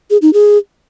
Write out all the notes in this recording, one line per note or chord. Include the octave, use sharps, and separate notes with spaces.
G#4
D#4
G#4